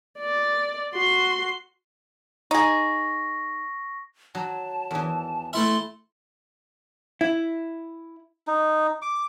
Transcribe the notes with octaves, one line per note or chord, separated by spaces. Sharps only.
D5
F#4 C6
D#4 G#4 C#6 A#6
F#3 A5
E2 E3
A3 E4 E5 C6
E4
D#4
D6